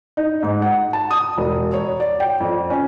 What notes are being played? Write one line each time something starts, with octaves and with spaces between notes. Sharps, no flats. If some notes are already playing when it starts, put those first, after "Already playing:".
D#4
G#2
F#5
A5
D#6
E1
C#5
D5
G5
F2
C#4